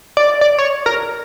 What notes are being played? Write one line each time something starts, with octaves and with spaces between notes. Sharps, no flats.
D5
D5
C#5
A#4